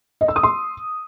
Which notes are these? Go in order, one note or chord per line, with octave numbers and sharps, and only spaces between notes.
D#5
E6
D#6
C6